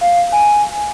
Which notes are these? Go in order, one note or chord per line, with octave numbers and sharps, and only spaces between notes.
F5
G#5